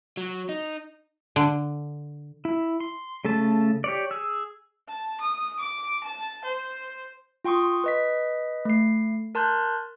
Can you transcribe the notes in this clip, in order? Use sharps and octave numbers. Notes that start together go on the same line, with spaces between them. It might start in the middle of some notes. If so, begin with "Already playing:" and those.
F#3
D#4
D3
E4
C6
C#3 A3 A4 A5
G4 C#5 D5
G#4 E6
A5
D#6
D6
A5
C5
F4 G5 C6 C#6 D#6
B4 D#5 B6
A3 C7
A#4 A5 C6 F#6 G6